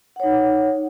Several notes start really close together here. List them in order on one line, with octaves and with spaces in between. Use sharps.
F#5 C#5 D#4